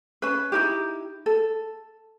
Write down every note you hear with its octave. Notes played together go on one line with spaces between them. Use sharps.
C#4 B4
D#4 E4 G4
A4